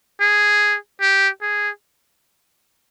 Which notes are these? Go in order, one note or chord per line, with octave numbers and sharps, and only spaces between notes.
G#4
G4
G#4